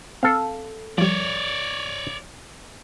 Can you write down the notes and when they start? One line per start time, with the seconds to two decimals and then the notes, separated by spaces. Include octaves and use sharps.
0.23 C4 A4 F5
0.98 F3 G3 C#5 D5